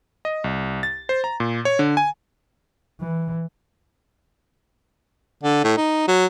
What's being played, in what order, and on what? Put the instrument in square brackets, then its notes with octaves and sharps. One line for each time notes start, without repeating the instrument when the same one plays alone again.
[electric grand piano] D#5
C2
A6
C5
A#5
A#2
C#5
D3
G#5
[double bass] E3
[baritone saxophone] D3
A2
D#4
F#3